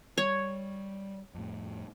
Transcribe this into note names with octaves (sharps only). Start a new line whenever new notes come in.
G3 C#5
F2 A2